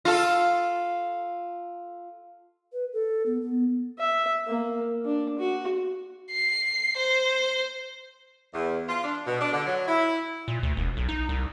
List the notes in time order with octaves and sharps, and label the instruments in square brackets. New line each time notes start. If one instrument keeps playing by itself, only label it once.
[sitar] F4 A4
[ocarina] B4
A4
B3
B3
[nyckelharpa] E5
A#3
D4
F#4
[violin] C7
C5
[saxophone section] E2
F4
D4
B2
D4
D3
F#3
E4
[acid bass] A#2
D2
E1
B1
D#4
C2